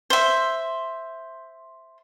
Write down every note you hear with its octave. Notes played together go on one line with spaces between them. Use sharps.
C5 E5